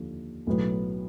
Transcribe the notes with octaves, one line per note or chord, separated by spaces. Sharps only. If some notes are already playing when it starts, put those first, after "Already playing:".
Already playing: D#2 D3 F3
B1 A2 F#3 B3